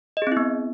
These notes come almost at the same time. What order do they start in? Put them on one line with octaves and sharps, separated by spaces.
D#5 G#4 C4 E4 B3